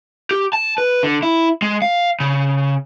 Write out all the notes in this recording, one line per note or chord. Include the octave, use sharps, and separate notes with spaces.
G4
A5
B4
D3
E4
G#3
F5
C#3